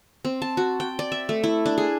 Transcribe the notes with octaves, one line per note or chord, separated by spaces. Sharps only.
C4
A5
F#4
G5
D5
E5
A3
E4
D4
G#4